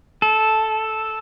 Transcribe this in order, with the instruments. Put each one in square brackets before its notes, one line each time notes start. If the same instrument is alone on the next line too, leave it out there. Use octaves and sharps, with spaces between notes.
[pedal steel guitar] A4